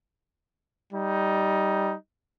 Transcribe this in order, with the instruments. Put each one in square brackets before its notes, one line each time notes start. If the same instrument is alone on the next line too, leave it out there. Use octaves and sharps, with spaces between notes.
[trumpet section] G3 D#4